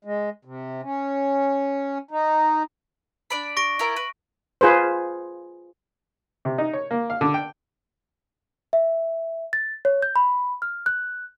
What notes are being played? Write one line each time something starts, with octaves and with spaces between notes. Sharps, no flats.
G#3
C3
C#4
D#4
D4 D5 B5
C#6 A#6 D7
E4 F4 A#4
B4
F4 G#4 B4 C5
C3
D#4
C#5
A#3
F5
D3
G5
E5
A6
C#5
G6
B5
F6
F#6